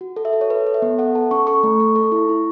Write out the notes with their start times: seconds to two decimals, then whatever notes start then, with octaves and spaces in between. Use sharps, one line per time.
0.01 F#4
0.16 A4
0.25 E5
0.33 A4
0.41 C#5
0.50 A4 B4
0.66 A4
0.74 E5
0.82 B3
0.98 A4 F#5
1.15 A4 A5
1.31 C#4 C#6
1.47 A4 C#6
1.63 A3
1.80 A4
1.96 A4
2.12 E4
2.29 E4